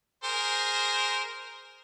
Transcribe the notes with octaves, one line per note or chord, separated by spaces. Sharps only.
G#4 A#4 C5